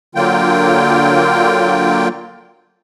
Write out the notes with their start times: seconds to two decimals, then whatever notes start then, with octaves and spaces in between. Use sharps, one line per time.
0.15 D3 F#3 A#3 F4 G5